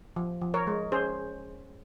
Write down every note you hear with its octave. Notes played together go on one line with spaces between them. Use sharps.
F3
F3
A#4 C#5
G#3
C#4 G#4 C5